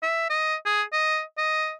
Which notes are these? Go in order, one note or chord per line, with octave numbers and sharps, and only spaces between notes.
E5
D#5
G#4
D#5
D#5